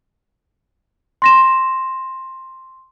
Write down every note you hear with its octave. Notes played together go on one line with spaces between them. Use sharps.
C6 A#6 E7